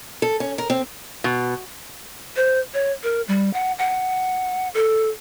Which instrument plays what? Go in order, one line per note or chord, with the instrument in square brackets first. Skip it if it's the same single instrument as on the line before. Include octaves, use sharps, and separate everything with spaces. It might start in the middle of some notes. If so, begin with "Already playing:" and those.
[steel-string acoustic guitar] A4
C#4
A#4
C4
[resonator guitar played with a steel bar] B2
[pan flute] C5
C#5
A#4
G3
F#5
F#5
A4